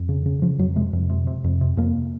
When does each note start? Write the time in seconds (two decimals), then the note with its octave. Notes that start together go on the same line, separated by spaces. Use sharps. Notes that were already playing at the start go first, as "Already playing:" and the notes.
Already playing: F2
0.09 C#3
0.26 C#3
0.42 C#3 F3
0.59 F2 F#3
0.76 C3 G#3
0.93 F2
1.09 C3
1.27 C3
1.44 F2
1.61 C3
1.77 F2 A#3